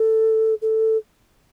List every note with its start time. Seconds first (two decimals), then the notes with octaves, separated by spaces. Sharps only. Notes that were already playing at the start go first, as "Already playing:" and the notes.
Already playing: A4
0.62 A4